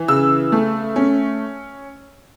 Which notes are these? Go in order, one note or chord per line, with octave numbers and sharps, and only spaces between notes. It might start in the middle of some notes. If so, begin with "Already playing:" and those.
Already playing: E3
C#3 E6
A3
C#4